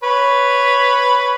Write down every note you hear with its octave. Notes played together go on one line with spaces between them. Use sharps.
B4 C#5